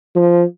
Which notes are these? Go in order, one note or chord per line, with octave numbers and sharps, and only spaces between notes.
F3